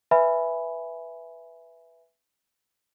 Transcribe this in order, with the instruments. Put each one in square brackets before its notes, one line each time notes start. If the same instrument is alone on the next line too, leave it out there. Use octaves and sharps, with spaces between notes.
[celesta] B4 E5 G#5 B5